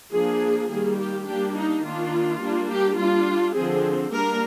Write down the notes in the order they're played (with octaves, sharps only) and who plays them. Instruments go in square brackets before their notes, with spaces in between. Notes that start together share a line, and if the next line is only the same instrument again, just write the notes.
[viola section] F3 A#3 D4 G#4
D#3 G3 A#3 G#4
G4
G3 A#3 D4 G4
D#4
D#3 A#3 D4 F4
G3 A#3 D4
G4
G3 D4 F4
D3 F3 C4 G#4
G3 A#3 D4 A#4